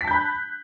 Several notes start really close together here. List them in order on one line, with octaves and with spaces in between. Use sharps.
B6 A5 G6 B5 F#6